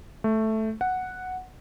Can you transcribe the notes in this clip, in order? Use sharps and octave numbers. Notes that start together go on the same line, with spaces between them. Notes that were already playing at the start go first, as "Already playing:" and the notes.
A3
F#5